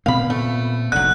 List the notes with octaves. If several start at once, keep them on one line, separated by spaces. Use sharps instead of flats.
A#2 B3 C4 F5 B5
A3
F1 B1 D3 F#3 F#6